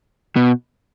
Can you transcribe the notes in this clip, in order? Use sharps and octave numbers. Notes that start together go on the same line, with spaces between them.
B2